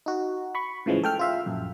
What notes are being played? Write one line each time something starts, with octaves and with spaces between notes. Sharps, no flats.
D#4 F#4
B5 C#6
A2 C#3 E3 F3 G#3
A4 G5 F6
F4 E5 F5
A#1 F#2